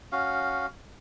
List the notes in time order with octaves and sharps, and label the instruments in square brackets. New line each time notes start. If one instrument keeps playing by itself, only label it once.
[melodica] C#4 F#4 F5